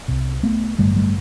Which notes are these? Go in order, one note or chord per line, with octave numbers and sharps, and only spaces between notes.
C2 C3
A3 B3
A1 G2 D3 G3 A3
G3 A3